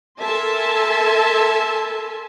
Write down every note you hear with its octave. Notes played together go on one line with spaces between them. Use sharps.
A4 A#4 E5 G#5 A5 C6